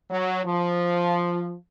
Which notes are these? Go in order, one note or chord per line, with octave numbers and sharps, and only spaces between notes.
F#3
F3